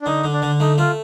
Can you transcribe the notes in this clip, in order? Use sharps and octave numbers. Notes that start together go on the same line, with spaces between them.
D4
D3 D#4
D3
D4
D3
A3 D#4
A3 F4